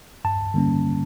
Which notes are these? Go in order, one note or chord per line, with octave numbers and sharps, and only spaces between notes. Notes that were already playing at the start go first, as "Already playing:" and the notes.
G2 A5
D3 G3 A#3 C#4